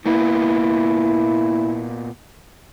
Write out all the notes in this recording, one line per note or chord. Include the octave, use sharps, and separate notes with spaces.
A#2 A#3 B3 E4